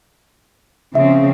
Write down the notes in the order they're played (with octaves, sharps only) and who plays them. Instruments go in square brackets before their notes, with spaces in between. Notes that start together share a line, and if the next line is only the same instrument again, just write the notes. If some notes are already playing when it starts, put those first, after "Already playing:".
[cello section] C#3 F3 C4 [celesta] E5